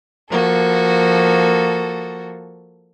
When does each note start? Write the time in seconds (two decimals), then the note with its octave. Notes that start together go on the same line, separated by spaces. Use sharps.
0.30 F3 A#3 F#4 A4